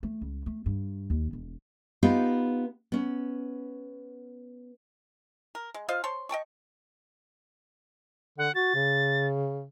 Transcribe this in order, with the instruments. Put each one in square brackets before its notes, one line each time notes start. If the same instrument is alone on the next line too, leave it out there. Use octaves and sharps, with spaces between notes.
[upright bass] A3
C#2
A3
G2
D#2
E1
[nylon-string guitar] B3 D#4 F4 G4 B4
B3 C#4
[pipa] A#4
G#3
F4 C5 D#5 F5
C5 C#5 A5 C6
D#5 G5 A5 C#6
[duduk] D3 [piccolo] F#5
[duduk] F#4 [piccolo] A6
[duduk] C#3